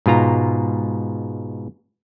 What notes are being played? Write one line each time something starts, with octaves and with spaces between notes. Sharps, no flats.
G#2 B2 F4 A#5